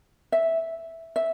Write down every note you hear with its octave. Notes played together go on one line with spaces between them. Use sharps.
E5
E5